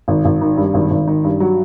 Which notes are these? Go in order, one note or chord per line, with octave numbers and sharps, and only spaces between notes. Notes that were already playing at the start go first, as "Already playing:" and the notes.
G#1
G#1
D#3
G2
G#1
G#1
D#3
G2
F#3